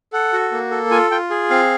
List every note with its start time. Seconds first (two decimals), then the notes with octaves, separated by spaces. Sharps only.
0.13 A4 F#5
0.33 F#4
0.52 A#3
0.71 A4
0.91 F4 G#5
1.11 F4 G5
1.30 G#4
1.50 C4 F5